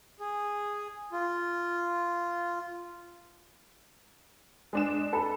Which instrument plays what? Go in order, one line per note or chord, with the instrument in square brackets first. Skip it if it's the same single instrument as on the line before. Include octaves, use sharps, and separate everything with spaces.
[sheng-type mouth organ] G#4
F4
[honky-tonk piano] G#3 D4 E7
A4 A5 B5